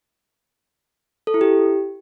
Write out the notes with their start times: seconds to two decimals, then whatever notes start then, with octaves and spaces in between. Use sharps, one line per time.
1.27 A4
1.34 E4
1.41 G4